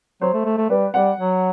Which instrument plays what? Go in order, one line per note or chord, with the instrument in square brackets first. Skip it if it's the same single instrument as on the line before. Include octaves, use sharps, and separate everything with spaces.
[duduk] F#3 [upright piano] C5
[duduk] A3
A3
A3
[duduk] G3 [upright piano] B4
[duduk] G3 [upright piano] F#5
[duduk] F#3